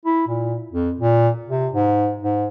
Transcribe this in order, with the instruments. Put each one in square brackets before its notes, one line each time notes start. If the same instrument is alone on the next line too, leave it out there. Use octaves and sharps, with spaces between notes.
[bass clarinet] E4
A#2
F2
A#2
C3
G#2
G#2